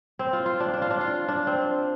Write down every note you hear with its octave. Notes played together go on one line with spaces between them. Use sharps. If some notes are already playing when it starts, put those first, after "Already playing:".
C4
F4
F4
D4
D4
F4
D4
F4
D4
C4